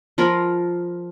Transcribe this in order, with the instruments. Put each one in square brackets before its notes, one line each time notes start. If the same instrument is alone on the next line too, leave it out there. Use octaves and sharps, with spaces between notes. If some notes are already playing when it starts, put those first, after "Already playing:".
[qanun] F3 F4 A#4 B5